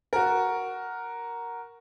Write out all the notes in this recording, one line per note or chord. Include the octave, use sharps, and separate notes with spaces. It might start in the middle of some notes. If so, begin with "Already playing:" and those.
F#4 A#4